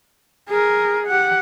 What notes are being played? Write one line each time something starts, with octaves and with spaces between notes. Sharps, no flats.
G#4 A#4
G4 F#5